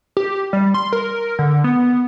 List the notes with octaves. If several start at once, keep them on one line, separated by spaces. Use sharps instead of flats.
G4
G3
C6
A#4
D3
B3